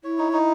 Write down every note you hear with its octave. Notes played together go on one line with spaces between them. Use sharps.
E4 C#5
D#4
D#4